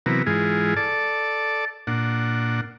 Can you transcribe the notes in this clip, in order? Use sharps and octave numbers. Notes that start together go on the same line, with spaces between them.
C3 E3 F#3 B3 A#4
G#2 E3 G#3 F4 G#4
A4 D5 A5
A#2 D4 F#5